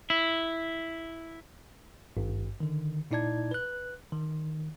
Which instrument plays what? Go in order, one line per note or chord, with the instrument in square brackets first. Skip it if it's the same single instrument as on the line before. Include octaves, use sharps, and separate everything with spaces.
[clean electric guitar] E4
[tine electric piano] G#1 G2
D3 D#3
A#2 D#4 E4 D5 A5 G#6
B4 F#6
D#3